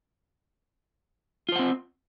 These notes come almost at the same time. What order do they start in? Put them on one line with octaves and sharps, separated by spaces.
F4 C5 F#5 C4